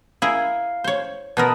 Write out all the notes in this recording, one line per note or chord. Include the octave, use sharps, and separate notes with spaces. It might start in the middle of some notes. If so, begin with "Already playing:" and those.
E4 G#4 A#4 F5
C5 C#5
B2 B3 A#4 A5 B5 D#6